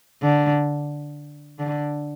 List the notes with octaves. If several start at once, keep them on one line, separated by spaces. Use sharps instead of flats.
D3
D3